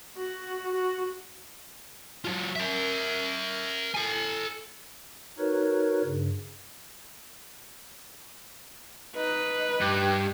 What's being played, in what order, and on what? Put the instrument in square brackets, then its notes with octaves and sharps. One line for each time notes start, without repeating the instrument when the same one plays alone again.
[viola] F#4
F#4
[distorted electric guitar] F#3 F4
A#4 E5
A4 G#5
[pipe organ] D#4 F#4 A#4 B4 C#5
G2 C#3
[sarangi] D#4 [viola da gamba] B4
[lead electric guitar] G2 [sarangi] G4